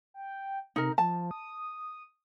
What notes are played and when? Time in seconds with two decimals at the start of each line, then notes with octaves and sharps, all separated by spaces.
0.14 G5
0.76 C3 D#4 A#4
0.98 F3 A5
1.31 D#6